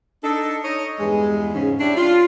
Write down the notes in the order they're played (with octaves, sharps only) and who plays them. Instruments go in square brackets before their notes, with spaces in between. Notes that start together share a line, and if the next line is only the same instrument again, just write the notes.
[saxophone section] D4 D#4 A4
D#4 C#5 D#5
E2 G2 G#3
G#2 C#3 C#4
D4 E4 G4 C#5 D5
F4